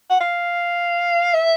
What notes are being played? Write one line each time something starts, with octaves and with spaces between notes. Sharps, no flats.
F#5
F5
E5